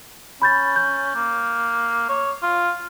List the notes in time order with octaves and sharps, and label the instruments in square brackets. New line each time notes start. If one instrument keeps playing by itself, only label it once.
[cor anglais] C#4 [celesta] B5 G6 A6
[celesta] G6
[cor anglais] A#3
C#5
F4